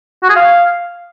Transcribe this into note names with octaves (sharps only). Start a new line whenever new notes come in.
F#4
G#4
F5